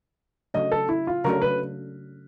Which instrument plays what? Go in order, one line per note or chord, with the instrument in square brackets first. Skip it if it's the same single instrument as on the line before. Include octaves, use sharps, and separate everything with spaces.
[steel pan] C#3 F#3 A3 D4 [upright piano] D#5
[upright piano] A4
E4
F4
[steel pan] C#3 F#3 A3 D4 [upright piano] A#4
[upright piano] B4